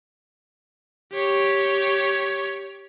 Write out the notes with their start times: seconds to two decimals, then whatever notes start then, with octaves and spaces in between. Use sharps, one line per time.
1.13 G4 C#5